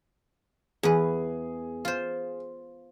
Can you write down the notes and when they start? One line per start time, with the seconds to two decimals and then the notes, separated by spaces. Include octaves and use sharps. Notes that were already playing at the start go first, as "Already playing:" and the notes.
0.83 E2 G#4 B4
1.85 F4 C5